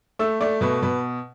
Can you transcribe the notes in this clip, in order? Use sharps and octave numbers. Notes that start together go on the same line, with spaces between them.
A3 E6
A3 D5
B2 B4
B2 B4